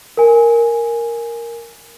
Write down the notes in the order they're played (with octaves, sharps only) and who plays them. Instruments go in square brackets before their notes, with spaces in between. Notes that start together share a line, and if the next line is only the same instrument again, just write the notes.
[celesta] A#4 G#5